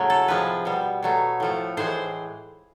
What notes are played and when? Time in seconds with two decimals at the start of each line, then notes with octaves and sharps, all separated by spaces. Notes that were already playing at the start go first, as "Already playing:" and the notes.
Already playing: A2 C#3 F#3 A3
0.10 A4
0.28 C3 F3 G#3 B4
0.65 B2 G3
1.03 B2 F#3 A3
1.40 A2 F3 A3
1.77 A2 E3 G#3 C5